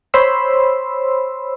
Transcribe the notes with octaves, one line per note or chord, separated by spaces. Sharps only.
C5 C#5 B5 C6 E6